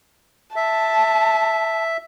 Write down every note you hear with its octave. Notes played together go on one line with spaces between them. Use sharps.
E5 A5